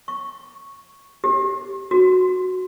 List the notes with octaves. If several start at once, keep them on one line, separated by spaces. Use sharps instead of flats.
C#6
G4
F#4